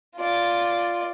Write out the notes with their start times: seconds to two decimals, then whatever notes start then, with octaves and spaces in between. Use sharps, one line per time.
0.15 F4 D5